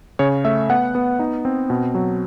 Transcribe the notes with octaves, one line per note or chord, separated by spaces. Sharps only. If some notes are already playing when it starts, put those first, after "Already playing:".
C#3 C#5
A3 E5
B3 F#5
B3
D#4
C4
B2
F#3